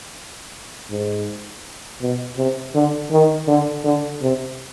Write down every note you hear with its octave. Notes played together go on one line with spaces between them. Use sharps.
G#2
B2
C3
D3
D#3
D3
D3
C3